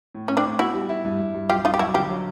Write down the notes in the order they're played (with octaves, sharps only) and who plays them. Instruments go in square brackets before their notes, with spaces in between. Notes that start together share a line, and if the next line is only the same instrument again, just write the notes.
[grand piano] A2
[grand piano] A2 [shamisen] C#4
[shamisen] C4 D4
[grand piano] A2
[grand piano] B3 [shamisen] E4 F#4
[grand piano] G3
E4
G2
G2
G2
[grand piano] B1 [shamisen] F4 G4
[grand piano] B1 [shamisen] D#4 F4
[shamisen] G4
[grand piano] B1 [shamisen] E4 F#4
[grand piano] D3 [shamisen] F4 G4
[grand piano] F#3